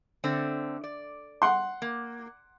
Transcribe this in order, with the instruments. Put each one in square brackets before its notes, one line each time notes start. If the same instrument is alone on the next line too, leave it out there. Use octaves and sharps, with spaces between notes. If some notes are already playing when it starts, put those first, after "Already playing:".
[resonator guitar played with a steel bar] D3 A3 C4
D5
[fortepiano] F#5 C6
[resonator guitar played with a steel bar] A#3